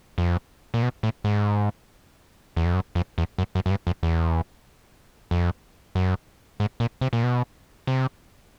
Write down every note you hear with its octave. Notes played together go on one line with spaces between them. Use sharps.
F2
A#2
B2
A2
G#2
E2
F2
F#2
F2
E2
F#2
F#2
F#2
G2
F2
E2
F2
F#2
G#2
A#2
C3
A#2
B2
C3